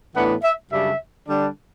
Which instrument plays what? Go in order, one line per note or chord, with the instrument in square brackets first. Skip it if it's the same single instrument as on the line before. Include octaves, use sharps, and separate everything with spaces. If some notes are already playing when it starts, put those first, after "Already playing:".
[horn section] A2 E3 B3 D4 F#5
E5
F#2 C#3 G3 D4 E5
D3 G3 D4